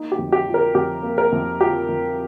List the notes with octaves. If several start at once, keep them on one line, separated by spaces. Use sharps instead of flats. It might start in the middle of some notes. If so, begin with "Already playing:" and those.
Already playing: A#3 D#4
G4
F2
G4
F3
A#4
F2 G4
A#3
A#4
F2
F3 G4
F2